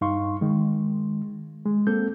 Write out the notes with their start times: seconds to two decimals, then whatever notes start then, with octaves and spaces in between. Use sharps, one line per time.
0.01 G2 D#4 F5 C6 C#6
0.41 D#3 G#3
1.65 G#3
1.87 A#3 C4 A4 G6